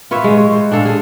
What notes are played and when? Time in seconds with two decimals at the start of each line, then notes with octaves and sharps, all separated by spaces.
0.11 F4 B4 C#5 E5
0.24 G#3
0.37 C#5
0.52 C5
0.71 D4 G#4 A4 F5
0.85 G#4